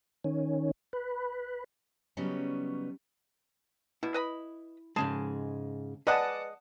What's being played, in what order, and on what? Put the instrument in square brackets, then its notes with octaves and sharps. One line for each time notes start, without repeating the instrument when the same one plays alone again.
[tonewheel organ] D#3 C#4
B4
[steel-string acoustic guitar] C#3 F#3 G3 B3 C#4 D#4
[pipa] B2 [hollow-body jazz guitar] E4
[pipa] B4 D#5 B5
[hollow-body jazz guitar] G#2 C#3 G#3 [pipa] G#4 A5
[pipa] G#3 D#5 [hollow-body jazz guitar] B4 [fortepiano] D5 F#5 A5